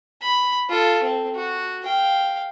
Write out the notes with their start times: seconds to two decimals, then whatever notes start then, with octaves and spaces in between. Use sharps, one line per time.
0.22 B5
0.69 F4 A4
1.03 C4
1.35 F#4
1.83 F5 G5